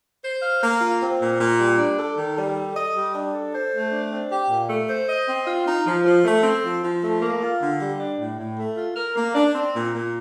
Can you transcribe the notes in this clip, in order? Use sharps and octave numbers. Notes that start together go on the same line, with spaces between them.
C5
F5
A#3
F4
C4
A#2
A#2
G3
D4
A4
D#3
G3
A4
D#5
G3
D4
A4
C5
A3
D4
C4
G4
A#2
A3
C5
D#5
C4
F4
D#4
F3
F3
A3
C4
F3
F3
A3
A#3
F4
D3
G3
D4
A2
A2
A3
F4
A#4
A#3
D4
C4
A#2
A#2